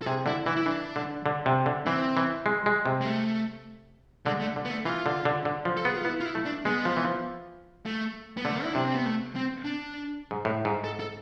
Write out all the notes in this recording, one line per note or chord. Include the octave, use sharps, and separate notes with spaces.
A4
C3 G#4
D3 E4
E3 E4
E4
E3 D4
D3
D3
C3
D3
E3 C4
E3
G#3
G#3
C3
G#3
A3
D3 G#3
A3
D3
B3
A3
E3 F4
D3
D3
D3
F3
A4
B3 G#4
F4
B3 E4
F4
E4
A3
D4
G#3 B3
F3
E3
F3
A3
B3
D3 A3
E4
C3 D4
C4
B3
A3
C4
D4
G#2
A2
G#2
A4
A4